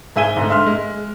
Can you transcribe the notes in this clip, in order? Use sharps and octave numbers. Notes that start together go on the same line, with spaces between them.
G#2 G#4 E5 G#5 D#7 G7
G#2 D3 A3
E5 C6 F6
G#3